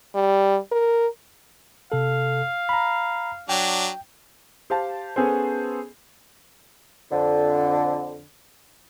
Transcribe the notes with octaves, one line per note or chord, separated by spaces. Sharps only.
G3
A#4
C3 A4 F5
A#5 B5
F#3 D4 G5
G4 C5 F5 A5
B3 C#4 G#4 A4 C5
F2 D3